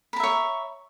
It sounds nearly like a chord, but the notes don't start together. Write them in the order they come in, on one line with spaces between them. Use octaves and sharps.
B5 A#5 E5 C#5